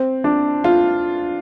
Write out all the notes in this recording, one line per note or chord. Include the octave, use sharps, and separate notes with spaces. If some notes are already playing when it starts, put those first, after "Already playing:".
Already playing: C4
D4
F4